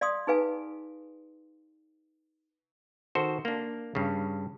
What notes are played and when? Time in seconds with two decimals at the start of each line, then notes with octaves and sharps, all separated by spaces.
0.01 D5 F5 C6 D#6
0.27 D#4 G#4 B4 F5 G#5
3.15 D#3 F#4 A4 C5
3.45 A#3 D4
3.95 G2 C#3